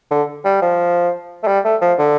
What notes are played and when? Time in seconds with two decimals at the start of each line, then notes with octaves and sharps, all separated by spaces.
0.11 D3
0.45 G3
0.62 F3
1.43 A3
1.47 G3
1.65 A3
1.81 F3
1.98 D3